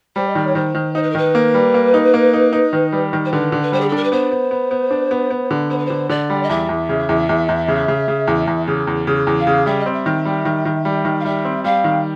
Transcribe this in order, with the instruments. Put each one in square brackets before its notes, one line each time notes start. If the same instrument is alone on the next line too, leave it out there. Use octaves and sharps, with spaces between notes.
[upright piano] G3 [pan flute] C5
[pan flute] D#5
[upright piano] D#3 [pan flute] D5
[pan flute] C#5
[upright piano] D#3 [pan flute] C5
[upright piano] D#3
[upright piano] D#4 [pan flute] C5
[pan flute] B4
A#4
[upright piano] D#3 [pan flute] B4
[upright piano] A#3
G3
A#3
D#4
A#3
D#4
D#4
D#3
G3
D#3
[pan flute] C5
[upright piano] D3 [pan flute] B4
[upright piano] D3
[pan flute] B4
[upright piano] G3 [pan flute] C5
[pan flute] G#4
A4
[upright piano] D4 [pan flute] A#4
[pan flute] B4
[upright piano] B3 [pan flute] C5
[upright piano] B3
B3
B3
D4
B3
B3
D3
[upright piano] B3 [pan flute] C5
[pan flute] B4
[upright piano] D3 [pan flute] C5
[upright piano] D3 [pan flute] D5
[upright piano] G3
[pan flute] D#5
[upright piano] E2 [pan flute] E5
[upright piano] E2
C#3
E2
E2
E2
C#3
C#3
C#3
E2
E2
C#3
E2
C#3
E2
[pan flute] F5
[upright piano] C#3
[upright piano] G3 [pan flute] E5
[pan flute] D#5
[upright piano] C4
[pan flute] E5
[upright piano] D#3
G3
D#3
D#3
G3
D#3
[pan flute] F5
[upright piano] G3 [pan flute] E5
[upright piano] C4
[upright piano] G3 [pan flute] F5
[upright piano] D#3